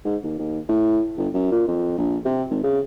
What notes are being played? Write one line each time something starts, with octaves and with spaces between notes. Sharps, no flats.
G#2
D#2
D#2
A2
G1
F#2
A#2
F2
A#1
C3
G#1
C#3